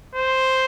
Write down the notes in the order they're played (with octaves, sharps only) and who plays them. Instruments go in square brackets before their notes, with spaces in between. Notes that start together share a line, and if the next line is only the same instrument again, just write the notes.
[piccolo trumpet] C5